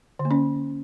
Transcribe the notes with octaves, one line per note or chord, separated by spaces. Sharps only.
D3
A#3
C#4